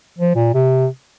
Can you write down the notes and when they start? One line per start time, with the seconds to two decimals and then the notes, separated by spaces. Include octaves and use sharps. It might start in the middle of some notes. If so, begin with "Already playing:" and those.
0.19 F3
0.36 A#2
0.54 C3